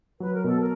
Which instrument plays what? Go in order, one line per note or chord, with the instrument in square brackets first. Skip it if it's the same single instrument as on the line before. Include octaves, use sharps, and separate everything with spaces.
[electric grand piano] F#3 [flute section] B4
[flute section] A#4
[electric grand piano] B2 [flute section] A4
[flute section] A#4